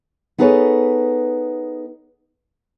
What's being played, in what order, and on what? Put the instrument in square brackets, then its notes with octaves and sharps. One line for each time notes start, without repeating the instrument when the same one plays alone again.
[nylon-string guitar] B3 D#4 G#4 A4 B4 C#5